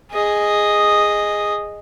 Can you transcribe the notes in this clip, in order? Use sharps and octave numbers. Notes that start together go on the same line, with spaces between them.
G#4 D#5